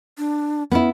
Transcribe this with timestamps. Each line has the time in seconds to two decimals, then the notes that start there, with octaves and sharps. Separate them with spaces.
0.18 D4
0.71 B3 C#4 E4